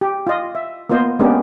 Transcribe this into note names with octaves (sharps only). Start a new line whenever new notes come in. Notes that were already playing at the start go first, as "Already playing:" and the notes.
G4
F4 D#5
E5
A#3 B3 F4 C5 D#5
G#3 A#3 B3 C#4 D4 G4